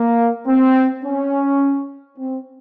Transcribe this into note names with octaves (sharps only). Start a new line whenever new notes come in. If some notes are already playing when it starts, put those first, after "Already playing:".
Already playing: A#3
C4
C#4
C4